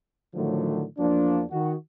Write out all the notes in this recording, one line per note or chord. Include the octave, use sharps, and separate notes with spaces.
A2 D3 D#3 F3 F#3 A3
E2 F3 A#3 D4
D#3 F#4